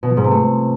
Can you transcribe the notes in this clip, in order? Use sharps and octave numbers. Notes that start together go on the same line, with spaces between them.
B2
F3
G#2
C3
A3